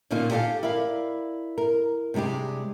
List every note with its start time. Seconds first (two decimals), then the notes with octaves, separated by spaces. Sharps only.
0.11 A#2 D3 A#3 C#4 D#4 F4
0.31 G4 A4 D5 E5 F5 G#5
0.63 E4 A#4 D5 F5
1.58 A#4
2.14 C3 G3 G#3 D4 G4